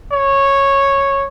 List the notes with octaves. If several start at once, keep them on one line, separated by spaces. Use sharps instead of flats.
C#5